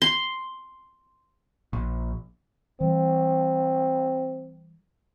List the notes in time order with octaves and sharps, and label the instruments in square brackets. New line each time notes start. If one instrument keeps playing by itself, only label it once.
[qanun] C6
[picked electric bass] A#1
[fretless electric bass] E3 G3 [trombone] C4